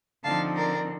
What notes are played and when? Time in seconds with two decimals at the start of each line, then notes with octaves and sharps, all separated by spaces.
0.24 D3 F3 C4 D#4 F5 A5
0.56 A#4 D5